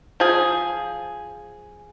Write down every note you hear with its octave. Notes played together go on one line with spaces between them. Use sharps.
F3 G#4